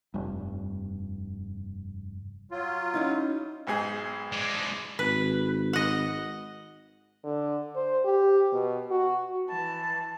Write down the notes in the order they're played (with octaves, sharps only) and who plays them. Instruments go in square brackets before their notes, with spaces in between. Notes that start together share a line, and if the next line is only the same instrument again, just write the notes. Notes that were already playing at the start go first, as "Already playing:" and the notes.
[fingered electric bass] F1 G2
[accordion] F#3 F4
[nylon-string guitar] C#4 D#4 E4
[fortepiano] B1 G#2 G#4
[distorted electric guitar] G#3 D4
[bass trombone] G#1 [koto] B4
[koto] D#5 F#5
[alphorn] D3
C5
G4
B2
F#4
[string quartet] E3 A5